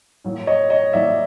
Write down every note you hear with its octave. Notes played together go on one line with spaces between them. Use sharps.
A2 F#3 A#3
C#5 D#5
C#5 D#5
A2 F#3 A#3 D5 E5